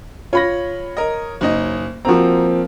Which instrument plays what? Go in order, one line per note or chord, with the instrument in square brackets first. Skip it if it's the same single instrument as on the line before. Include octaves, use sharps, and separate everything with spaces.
[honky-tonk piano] F4 B5 A#6 [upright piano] C#5
[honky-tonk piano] A#4 D#5
F#1 D#4 D#5
[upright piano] F3 A#3 C4 [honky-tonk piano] F#4 A#5